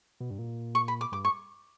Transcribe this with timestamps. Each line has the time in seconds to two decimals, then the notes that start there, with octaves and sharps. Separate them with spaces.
0.20 B2
0.30 G2
0.39 A#2
0.75 C#6
0.88 B5
1.01 D6
1.12 G2 D6
1.25 C#6